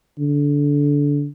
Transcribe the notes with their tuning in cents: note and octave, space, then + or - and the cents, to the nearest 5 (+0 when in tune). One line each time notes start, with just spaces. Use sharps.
D3 -20